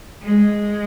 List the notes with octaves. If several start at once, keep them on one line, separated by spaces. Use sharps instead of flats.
G#3